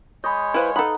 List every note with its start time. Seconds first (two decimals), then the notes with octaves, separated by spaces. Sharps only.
0.24 G#3 C#5 D#5 B5 G6
0.54 E4 B4 C5 F5
0.76 D#4 A4 B4 F#5 B5